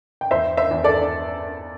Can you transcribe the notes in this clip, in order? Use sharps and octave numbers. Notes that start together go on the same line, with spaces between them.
G5
E2 C5 E5
C5 E5
E2
A4 D5